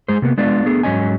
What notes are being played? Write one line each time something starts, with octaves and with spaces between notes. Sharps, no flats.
G#3 G#4 C5
C3 A#3 B3
G#3 B3 D4 F4 D5
A3 B3 D4 G#4
G#2 F#3 A#3 C#4 D#5 G#5